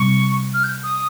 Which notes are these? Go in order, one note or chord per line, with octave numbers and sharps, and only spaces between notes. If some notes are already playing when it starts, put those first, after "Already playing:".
Already playing: C3 G3 C4 C#6
F6
G6
D#6